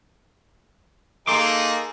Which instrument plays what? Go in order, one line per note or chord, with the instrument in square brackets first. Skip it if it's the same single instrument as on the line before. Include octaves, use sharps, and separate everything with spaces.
[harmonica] A#3 D#4 G#4 [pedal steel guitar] A4 C6 D6